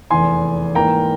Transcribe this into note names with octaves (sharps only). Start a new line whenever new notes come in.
F1 E2 E3 G#5 C6
G#2 E3 A#3 G5 A#5